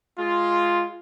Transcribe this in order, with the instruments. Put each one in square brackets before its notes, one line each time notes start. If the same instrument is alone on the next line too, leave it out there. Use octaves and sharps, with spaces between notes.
[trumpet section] G#3 F4